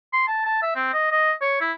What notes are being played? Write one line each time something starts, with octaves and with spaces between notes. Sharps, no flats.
C6
A5
A5
E5
C4
D#5
D#5
C#5
E4